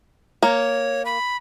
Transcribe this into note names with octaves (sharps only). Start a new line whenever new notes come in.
A#3 C#5
B5